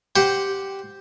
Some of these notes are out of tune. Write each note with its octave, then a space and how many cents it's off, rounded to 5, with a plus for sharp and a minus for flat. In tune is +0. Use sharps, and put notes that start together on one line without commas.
G4 -5 C5 +0 F#5 +0